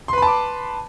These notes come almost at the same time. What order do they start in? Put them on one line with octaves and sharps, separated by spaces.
C6 B4 B5 A5 D6